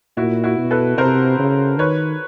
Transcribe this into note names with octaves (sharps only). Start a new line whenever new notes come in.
A#2 E4 F#4
E4 F#4
B2
A4 B4
C3 A#4 C5
C#3
D#3 B4 C#5